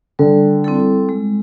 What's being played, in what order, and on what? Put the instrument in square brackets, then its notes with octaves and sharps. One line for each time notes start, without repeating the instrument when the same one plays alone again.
[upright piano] D3 [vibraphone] G3
[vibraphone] C4 E4 A4
G#3